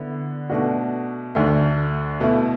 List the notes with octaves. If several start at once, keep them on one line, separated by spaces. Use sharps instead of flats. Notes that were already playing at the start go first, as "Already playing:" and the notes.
Already playing: D3 B3 E4
B2 A3 D4 F#4
D2 D3 A3
B2 A3 E4